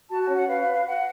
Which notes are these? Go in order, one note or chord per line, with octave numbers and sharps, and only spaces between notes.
F#4 A5
A5
C#4
F#5
B4 F5
F5
F#4
F5
F#4 F#5